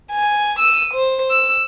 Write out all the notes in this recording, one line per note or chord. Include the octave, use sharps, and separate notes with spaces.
G#5
E6 D#7
C5
E6